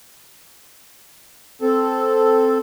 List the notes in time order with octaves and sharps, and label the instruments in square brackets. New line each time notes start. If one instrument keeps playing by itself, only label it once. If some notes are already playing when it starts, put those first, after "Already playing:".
[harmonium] C4 A4